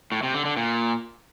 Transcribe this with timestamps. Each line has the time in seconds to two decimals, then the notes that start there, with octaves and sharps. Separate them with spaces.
0.12 A2
0.23 C3
0.34 D3
0.45 D3
0.57 A#2